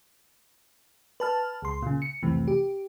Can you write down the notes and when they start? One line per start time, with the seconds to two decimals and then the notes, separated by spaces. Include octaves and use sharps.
1.20 B4 A5 F6
1.62 C#2 C6
1.82 A#2 C#3
2.02 C#7
2.23 C2 F2 C3 E3 A3
2.48 G4